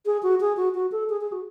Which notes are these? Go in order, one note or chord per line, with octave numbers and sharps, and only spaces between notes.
G#4
F#4
G#4
F#4
F#4
A4
G#4
G#4
F#4